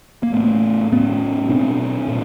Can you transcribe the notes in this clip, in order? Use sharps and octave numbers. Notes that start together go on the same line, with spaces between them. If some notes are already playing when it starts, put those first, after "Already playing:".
A#3
A2 A3 B3
A2 B3 C#4
B2 C4 D4
A#2